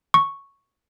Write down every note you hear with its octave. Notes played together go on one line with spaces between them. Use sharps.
C#6